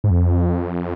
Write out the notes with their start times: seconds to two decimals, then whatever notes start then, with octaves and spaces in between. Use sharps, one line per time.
0.04 G#2
0.10 F2